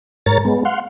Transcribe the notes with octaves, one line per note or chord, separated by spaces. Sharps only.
G#2 A#4 C#5 A#5 A6
G#3 B3
F5 F#5 C6